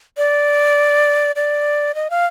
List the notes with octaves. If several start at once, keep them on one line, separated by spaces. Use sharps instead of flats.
D5
D5
D#5
F5